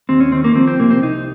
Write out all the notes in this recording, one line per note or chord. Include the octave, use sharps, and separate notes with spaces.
D#2 C4
C#4
D#3 C4
A#3
F3 C4
C4
C2 A#3
C4
C2 D#4